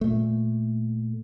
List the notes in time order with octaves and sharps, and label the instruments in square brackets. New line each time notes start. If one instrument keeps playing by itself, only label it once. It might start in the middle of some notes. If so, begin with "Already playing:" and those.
[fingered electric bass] A#2 A3